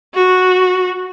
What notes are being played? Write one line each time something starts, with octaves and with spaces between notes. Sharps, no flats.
F#4